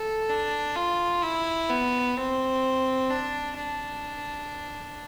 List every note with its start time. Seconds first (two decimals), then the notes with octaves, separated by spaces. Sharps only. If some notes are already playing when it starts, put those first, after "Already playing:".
Already playing: A4
0.29 D4
0.76 F4
1.22 E4
1.70 B3
2.16 C4
3.10 D4
3.56 D4